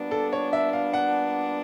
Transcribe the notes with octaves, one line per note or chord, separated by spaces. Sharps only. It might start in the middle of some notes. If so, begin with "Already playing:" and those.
Already playing: A#2 G3 B3 D4
A4
C#5
E5
F5
F#5